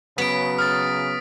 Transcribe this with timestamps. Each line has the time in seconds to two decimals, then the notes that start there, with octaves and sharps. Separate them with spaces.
0.18 C#3 F#3 B3 B6 D7
0.58 D#6 F6 A6